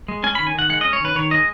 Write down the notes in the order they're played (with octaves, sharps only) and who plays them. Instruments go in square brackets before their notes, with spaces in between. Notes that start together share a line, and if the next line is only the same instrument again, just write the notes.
[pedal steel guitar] G#3
C#4 G#5
D#3 B5
G#5
D#3 F#5
G#3 F#5
C#4 D#5
C#5
D#3 B4
D#3 C#5
G#3 D#5